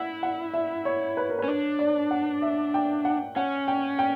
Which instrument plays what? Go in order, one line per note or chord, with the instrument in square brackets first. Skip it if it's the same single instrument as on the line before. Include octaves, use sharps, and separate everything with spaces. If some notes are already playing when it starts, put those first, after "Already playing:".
Already playing: [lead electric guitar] E4 [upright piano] F#5
[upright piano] F#5
E5
C#5
B4
A#4
B4
[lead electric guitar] C#4
[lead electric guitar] D4 [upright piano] C#5
[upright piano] D5
F#5
E5
G5
F#5
[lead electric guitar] C#4 [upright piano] F#5
[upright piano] G5
G5